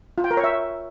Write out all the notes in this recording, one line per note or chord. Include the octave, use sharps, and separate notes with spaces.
F4
G5
A#4
C#5
E5